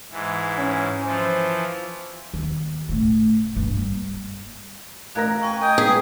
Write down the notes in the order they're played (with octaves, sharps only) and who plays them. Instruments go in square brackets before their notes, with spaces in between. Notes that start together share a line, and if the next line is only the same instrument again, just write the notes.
[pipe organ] G#2 E3
[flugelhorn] C#4
[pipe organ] E3 F3 [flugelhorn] C5
[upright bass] D#2
A2 C#3
G2 A#3
G3
[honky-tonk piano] A1 A#4 A#6 [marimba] F5 F#6 G#6
[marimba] G5 [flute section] G#5 C#6
[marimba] D#5 [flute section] G5 G#5 D#6
[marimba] G#3 B4 [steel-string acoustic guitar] G#4